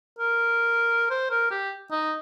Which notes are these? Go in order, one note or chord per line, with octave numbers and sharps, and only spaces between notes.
A#4
C5
A#4
G4
D#4